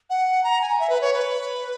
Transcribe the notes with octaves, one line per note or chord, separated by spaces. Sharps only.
F#5
A#5
G#5
E5
B4
C#5
B4